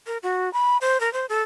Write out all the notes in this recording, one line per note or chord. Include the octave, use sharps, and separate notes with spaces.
A#4
F#4
B5
C5
A#4
C5
A4